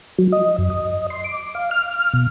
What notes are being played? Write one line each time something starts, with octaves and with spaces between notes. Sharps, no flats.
F#3
D#5
F#2
D#5
C6
D6
F5
F6
B2